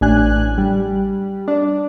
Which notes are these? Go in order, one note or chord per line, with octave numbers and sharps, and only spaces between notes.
A1 D4 G#5 F#6
G3
D4